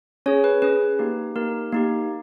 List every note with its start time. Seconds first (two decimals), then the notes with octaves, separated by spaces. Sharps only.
0.26 C#4 G#4 C#5
0.44 B4
0.62 C#4 G#4 B4
0.99 A#3 D#4 G4
1.35 A#3 D#4 G4 A#4
1.72 A#3 D#4 G4